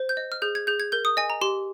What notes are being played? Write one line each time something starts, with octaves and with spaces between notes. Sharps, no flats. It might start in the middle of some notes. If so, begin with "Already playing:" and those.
Already playing: C5
G6
D#5
F6
G#4 G6
G#6
G#4 G6
G#6
A#4 G6
D#6
D#5 G#5
A#5
G4 C6